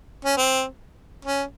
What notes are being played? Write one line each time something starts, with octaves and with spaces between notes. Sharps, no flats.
C#4
C4
C#4